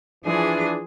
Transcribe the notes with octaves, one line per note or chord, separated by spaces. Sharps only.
E3 F3 D4 G#4